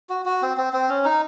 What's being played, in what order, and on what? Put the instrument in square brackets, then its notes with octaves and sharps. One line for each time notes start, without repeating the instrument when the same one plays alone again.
[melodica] F#4
F#4
C4
C4
C4
C#4
D#4